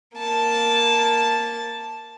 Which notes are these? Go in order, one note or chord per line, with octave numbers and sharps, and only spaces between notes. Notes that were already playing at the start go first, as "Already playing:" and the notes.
A#3 A5